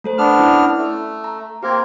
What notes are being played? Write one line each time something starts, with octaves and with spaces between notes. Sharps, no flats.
A3 A4 C5
B3 D4 B4 F6
C#4 E4
A3
A#5
A#3 C4 G4 A#4 G#6